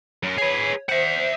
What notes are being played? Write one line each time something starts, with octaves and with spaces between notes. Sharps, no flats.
F#2
G#4 B4 C#5
C5 E5 F#5